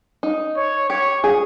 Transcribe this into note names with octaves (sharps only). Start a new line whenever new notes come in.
D#4
C#5
G4 C#5
G#4